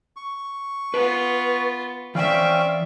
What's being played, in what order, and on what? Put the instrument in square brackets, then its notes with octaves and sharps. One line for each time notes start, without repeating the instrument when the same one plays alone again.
[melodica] C#6
[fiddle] B3 F4 [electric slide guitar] B4
[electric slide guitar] E3 G5 [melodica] C4 C#4 F5 [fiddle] D5 E5